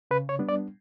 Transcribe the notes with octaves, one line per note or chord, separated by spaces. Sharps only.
C#3 B4
C#5
G3 B3 D4
D5